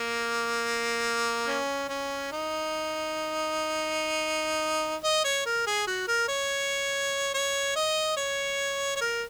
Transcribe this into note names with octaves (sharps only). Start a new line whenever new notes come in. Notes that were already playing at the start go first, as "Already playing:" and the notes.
Already playing: A#3
C#4
C#4
D#4
D#5
C#5
A#4
G#4
F#4
A#4
C#5
C#5
D#5
C#5
C#5
A#4